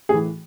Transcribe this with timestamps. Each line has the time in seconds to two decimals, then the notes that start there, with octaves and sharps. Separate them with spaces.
0.09 A2 E3 G#4